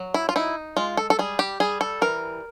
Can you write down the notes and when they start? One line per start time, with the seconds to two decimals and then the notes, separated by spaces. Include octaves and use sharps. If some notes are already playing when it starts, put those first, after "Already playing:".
Already playing: F#3
0.14 E4
0.29 F4
0.36 D#4 E4
0.77 G#3 F4
0.97 A4
1.10 A4
1.19 G3 G#4
1.39 G4
1.60 G3 G#4
1.81 A4
2.01 E3 A#4